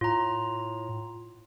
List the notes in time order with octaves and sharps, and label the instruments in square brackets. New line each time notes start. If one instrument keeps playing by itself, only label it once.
[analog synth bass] A2 [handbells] F4 A#5